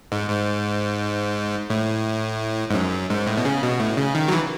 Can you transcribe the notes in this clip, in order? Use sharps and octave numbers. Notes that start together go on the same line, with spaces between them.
G#2
G#2
A2
G#2
F#2
G#2
A2
B2
C#3
B2
A2
C#3
D#3
F#3
E3